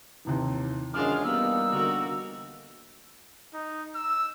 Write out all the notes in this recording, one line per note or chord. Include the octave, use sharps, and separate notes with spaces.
D#2 C3 E3
F#2 E3 G#3 D4 F4 D6 F6
G3 A#3 B3 D#4 E6
D3 F#4 A#4
D#4
E6